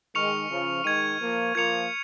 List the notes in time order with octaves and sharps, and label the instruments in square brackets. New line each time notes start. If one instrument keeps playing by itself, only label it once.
[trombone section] D#3 G#3 [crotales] C#6 F6 C#7 F7
[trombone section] C#3 F3
[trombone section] D#3 G#3 [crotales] G#6 D#7
[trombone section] F3 A#3
[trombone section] F3 A#3 [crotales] G#6 C#7 F7